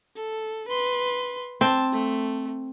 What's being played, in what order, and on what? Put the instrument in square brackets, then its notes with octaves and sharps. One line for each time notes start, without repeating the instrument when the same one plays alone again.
[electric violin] A4
B4 C6
[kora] C4 [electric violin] A5
[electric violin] A3